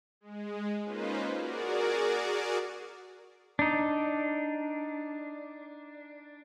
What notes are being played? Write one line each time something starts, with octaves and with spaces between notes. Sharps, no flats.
G#3
A#3 C#4 D#4 F4 B4 C5
F#4 G#4 A#4 D5
D4 D#4